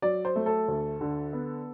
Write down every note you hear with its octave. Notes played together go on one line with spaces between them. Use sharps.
F#3 D5
C5
A3
A4
D2
D3
B3